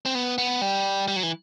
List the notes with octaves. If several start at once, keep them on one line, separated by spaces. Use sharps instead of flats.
C4
B3
B3
G3
G3
F#3
E3